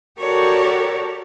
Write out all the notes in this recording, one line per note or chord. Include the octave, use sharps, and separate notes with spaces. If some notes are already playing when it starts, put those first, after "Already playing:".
F#4 G4 A4 A#4 C#5 D5